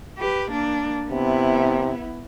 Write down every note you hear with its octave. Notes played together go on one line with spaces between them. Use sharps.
G4 B4
A#3 D4
C3 B3 E4